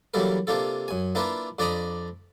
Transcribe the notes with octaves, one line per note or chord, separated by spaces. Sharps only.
E3 F#3 G3 A#3 A4 A#4
C3 A#3 D4 F4 A4
F#2 G#5
A#3 D4 E4 F4 A#4 B4
F2 D4 D5 A#5 B5 D#6